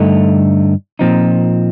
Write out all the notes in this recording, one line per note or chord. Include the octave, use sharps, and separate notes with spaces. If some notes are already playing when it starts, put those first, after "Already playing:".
Already playing: G2 D3 A3 D#4
A#2 F3 C4 D#4